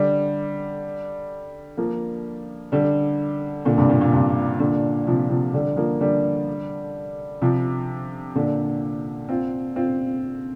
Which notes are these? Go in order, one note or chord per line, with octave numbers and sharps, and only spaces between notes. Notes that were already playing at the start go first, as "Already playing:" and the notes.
Already playing: D3 G3
F3 A#3
D3 G3
A#2 D3
G2 C3
A#2
A#2
G2 C3
A#2 D3
C3 F3
C3 F3
D3 G3
F3 A#3
D3 G3
C3 F3
A#2 D3
C4 F4
C4 F4